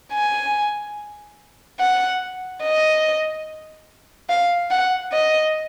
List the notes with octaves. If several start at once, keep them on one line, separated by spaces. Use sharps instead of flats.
G#5
F#5
D#5
F5
F#5
D#5